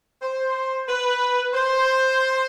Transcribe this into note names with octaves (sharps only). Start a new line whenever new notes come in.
C5
B4
C5